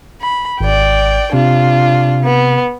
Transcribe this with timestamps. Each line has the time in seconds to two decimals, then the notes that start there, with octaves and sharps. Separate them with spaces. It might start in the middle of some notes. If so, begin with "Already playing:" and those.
0.21 B5
0.61 G#1 D5 G5
1.33 C3 D4 F4
2.23 B3